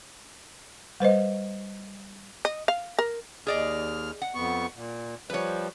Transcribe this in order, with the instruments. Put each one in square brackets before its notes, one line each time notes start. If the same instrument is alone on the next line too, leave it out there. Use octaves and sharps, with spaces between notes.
[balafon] G3 B4 C5 D#5
[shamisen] D#5
F5
A#4
[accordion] D#2 F6 [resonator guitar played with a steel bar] G#4 D5 D#5
[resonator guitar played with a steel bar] F#5
[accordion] F2 B3 C#6
A#2
[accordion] F3 G3 [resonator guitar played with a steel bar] B4 C#5